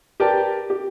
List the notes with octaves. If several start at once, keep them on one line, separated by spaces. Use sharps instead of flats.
G4 A#4 B4 D5 G5 A5
G4